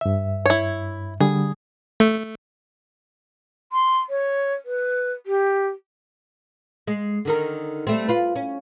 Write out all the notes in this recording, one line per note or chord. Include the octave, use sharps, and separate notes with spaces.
G2 E5
E4 C#5
D3 G3 G#4
A3
C6
C#5
B4
G4
G#3
D3 D#3 A#4
G3 A3 C4
F4 B4
C#4